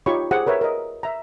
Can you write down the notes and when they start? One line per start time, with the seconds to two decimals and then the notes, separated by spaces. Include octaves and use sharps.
0.06 D#4 F4 G4 C#5 B5 C#6
0.31 G4 G#4 C5 F#5
0.46 A#4 B4 C#5 E5
0.61 A#4 D#5
1.03 E5 A#5